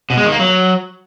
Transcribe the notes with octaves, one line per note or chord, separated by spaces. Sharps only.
B2
G#3
D#3
A#3
F#3